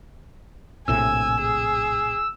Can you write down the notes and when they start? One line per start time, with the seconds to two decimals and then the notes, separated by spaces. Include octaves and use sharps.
0.88 A#1 A2 C3 G#5 E6
1.42 G#4